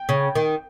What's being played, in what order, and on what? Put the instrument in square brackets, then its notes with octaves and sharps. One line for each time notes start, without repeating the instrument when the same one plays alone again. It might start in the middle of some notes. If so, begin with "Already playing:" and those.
Already playing: [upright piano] G5
[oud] C#3
D#3